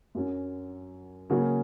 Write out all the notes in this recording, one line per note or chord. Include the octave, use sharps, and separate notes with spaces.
F#2 F#3 C#4
C#3 F#3 A#3 C#4 F#4